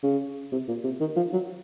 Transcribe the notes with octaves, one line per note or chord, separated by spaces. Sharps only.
C#3
C3
A#2
C3
D#3
F3
F#3